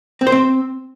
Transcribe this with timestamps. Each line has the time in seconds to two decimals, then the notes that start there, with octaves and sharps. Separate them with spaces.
0.21 C4
0.27 C5
0.32 C4